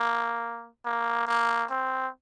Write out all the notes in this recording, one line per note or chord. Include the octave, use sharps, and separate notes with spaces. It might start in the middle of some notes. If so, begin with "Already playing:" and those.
Already playing: A#3
A#3
A#3
C4